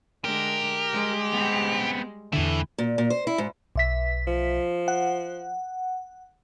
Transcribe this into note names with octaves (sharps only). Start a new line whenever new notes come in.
D3 G#3 D4 G4 A#4
G3 G#3
B3 C4
E2 A2 D3 E3 E4
A#2
A#2
C5
E4
G#2
B1 E5 B6
F3
F#5